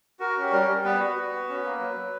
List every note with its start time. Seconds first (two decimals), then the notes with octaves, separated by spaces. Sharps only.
0.19 F#4 A#4
0.37 C#4 G4
0.52 G3 A#4
0.68 G3
0.84 B3 B4
0.99 F#4
1.16 F#4
1.32 B3
1.49 C#4
1.65 A#3
1.79 F#3
1.97 F#3